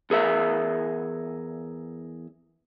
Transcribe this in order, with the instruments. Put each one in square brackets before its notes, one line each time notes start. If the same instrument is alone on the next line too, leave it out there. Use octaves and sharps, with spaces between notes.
[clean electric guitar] E2 G#4 A#4 E5